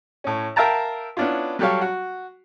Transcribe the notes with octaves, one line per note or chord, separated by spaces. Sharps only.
A2 C#4
A#4 E5 F5 G5 A5 A#5
B3 C#4 D4 E4 F4
F#3 G3 G4 A4 C#5 F5
F#4